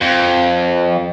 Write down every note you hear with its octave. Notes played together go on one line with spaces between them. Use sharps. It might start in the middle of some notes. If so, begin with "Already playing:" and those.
F2